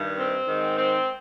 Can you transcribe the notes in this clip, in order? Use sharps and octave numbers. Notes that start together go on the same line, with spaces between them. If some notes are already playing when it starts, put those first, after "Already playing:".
Already playing: G2 D#3
C4
G#2 D#3
C4